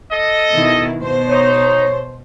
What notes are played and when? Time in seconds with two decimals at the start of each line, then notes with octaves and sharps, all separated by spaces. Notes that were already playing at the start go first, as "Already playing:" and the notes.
0.12 A4 D#5
0.53 B2 D#3 E4
1.01 B2 C5
1.30 D#4 C#5